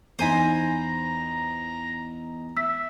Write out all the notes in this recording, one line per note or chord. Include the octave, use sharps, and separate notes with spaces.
E2 D#4 C5 G#5 A#5 B5
E5 E6 B6